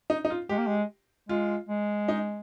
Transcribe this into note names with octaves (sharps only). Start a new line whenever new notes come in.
D#4
D#4
F4
G#3 G4
A#3
G#3
G#3 F4
G#3
D#4